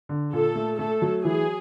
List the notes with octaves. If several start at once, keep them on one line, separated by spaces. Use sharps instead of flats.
D3
A#2 A4
A3
A3 A4
F#3
E3 G#4